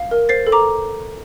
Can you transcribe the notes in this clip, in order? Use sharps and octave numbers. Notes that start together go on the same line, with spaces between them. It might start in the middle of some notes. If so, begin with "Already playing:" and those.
Already playing: F5
A#4
C5 A6 C7
A4
A#5 D6